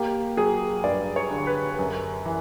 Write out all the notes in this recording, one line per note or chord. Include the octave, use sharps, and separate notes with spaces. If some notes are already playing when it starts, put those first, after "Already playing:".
Already playing: A#3 G4
F#3 G#4
G2 D5
C#5
D3
B4
F#2
E3